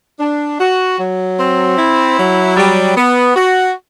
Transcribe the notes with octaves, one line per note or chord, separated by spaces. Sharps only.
D4
F#4
F#3
C4
E4
F#3
G3
B3
F#4